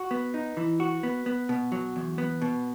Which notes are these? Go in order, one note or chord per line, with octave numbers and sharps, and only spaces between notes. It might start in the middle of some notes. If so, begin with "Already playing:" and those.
Already playing: F#4
B3
D#4
E3
F#4
B3
B3
B2
F#3
E2
B3
B2